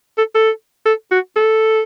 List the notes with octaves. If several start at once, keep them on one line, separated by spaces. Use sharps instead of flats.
A4
A4
A4
F#4
A4